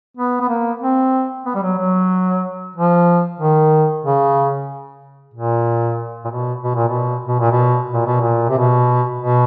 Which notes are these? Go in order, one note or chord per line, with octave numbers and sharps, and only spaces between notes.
B3
B3
A#3
C4
B3
G3
F#3
F#3
F3
D#3
C#3
A#2
A#2
B2
B2
A#2
B2
B2
A#2
B2
A#2
B2
A#2
C3
B2
B2